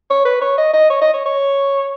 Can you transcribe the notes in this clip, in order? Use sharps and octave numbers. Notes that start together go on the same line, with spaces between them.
C#5
B4
C#5
D#5
D#5
C#5
D#5
C#5
C#5